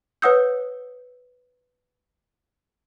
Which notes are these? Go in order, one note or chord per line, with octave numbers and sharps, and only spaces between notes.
B4 C#5 F#5 D#6 E6 G6